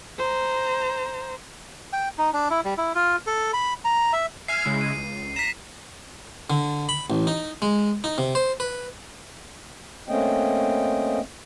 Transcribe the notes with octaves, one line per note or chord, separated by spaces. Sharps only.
C5 A#5
G5
D#4
D4
E4
G3
E4
F4
A4
B5
A#5
E5
E5 G#5 F6 C7
C#3 G#3 E4
D#7
C#2
A#5 B6 E7
D3
B5
A1
D#4
G#3
D#4
C3
C5
B4
A3 A#3 C4 C#4 D#5 G5